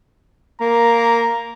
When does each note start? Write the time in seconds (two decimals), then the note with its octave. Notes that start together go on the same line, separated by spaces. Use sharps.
0.61 A#3 A#5